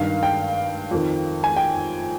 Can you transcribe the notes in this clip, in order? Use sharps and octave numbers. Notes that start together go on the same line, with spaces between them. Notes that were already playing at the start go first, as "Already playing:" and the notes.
Already playing: G2 D#3 F5
G5
F2 D#3
G#5
G5